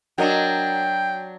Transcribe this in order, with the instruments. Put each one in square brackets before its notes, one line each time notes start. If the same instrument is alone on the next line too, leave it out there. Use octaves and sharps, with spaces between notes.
[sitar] F#3 D4 [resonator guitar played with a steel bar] F#4 A#4 D#5 [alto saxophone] G5